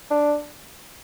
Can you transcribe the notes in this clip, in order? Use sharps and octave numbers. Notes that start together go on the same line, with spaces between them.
D4